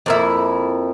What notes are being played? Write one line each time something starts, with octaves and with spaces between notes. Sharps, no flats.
F2 A#3 E4